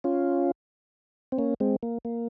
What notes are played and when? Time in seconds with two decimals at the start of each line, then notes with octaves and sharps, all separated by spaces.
0.04 C#4 F4
1.32 C4
1.38 A#3 C#4
1.60 G#3 C4
1.83 A#3
2.05 A#3